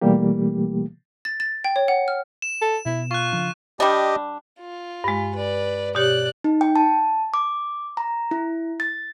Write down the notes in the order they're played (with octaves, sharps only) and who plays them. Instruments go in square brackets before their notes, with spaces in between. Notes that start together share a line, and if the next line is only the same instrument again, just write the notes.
[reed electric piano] B2 E3 G3 A3 A#3 G4
[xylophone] A6
A6
G5
C#5
F#5
F6
[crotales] E7
[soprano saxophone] A4
[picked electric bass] B2 B3 [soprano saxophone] E4
[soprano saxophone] F4 [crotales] C#6 F#6
[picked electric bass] C#3 F3 D4
[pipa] G3 D4 [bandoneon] G4 D#5
[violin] F4
[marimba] G2 G#3
[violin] B4 D5
[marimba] B2 G4 C#5 [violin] D5 F#6
[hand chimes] D#4
G5
A5
D6
A#5
E4
A6